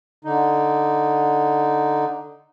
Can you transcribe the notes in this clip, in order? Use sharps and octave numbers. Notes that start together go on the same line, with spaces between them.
D3 D#4